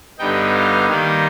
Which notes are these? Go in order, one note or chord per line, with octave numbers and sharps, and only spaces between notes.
G2 D3 G3 B3 D#4 G5
F5
D#3 G3 A#3 D#4